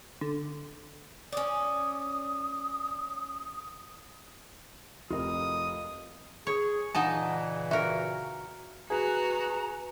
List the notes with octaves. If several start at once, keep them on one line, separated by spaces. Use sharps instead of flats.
D3
C#4 D5 D#6
F1 C3 F4 A#4 D#5 D#6
G#4 C#5
A#2 C#3 E3 D#4 D#5 F#5 G#5 A5
F#4 A#4 E5
F#4 G#4 B4 A#5